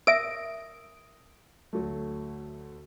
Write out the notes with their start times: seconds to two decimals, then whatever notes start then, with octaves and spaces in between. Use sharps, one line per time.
0.07 A#4 E5 D#6 D7
1.73 D2 F#3 A3